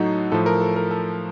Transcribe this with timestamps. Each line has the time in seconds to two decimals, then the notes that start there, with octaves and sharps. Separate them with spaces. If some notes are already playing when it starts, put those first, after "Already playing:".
Already playing: A2 F#3 D#4 F#4 A4
0.32 A2 F3 A4
0.46 A#4
0.61 A4
0.76 A#4
0.91 A4